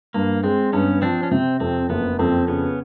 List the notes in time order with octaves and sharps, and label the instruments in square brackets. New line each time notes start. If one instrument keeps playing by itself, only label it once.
[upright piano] G2 [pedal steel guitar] A#3
[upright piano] G#3 [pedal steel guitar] C4
[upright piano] G2 [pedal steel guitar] B3 C#4
[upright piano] F3 [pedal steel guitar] C4 D4
[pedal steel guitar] C#4
[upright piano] C3 [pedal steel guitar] C4
[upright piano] F2 [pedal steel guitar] C4
[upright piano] F#1 [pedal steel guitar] B3
[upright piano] F2 [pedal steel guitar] C4
[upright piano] C#3 [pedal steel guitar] B3 C#4